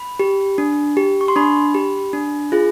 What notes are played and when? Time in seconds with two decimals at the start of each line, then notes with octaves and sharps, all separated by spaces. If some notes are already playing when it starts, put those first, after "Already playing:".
Already playing: B5
0.19 G4
0.58 D4
0.97 G4
1.21 C#6
1.28 C6
1.36 D4 B5
1.74 G4
2.13 D4
2.52 F4 G#4